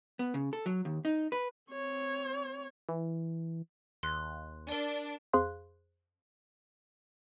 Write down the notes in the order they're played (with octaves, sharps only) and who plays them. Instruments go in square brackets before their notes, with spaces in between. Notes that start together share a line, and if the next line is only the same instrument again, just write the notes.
[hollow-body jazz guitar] B3
C#3
A4
F#3
D#2
D#4
B4
[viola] C4 C#5
[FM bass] E3
[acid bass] D#2 [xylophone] C6 F#6
[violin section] D4 [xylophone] A#4 D5
[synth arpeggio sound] F2 G#4 C5 F5 C6 F#6